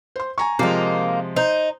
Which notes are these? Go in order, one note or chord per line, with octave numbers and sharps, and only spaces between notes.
C5 C6
G#5 A#5 C#6
C3 F3 G#3 A#3 D#4
D#4 C5